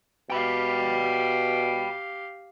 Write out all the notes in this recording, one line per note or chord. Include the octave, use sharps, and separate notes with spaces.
B2 G4 F5 G5 B5